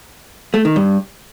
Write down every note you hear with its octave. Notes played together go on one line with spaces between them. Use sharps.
A3
D#3
G2